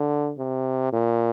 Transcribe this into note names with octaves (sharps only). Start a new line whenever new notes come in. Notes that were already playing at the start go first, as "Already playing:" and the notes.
Already playing: D3
C3
A#2